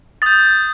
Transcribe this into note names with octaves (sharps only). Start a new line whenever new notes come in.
D#6 G6 A6